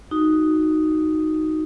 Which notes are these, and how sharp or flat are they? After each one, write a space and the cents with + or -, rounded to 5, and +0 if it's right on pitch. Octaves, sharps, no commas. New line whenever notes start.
D#4 +0 F#4 +0 D#6 +0